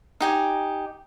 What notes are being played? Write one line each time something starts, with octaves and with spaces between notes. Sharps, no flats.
D#4 G4 G#5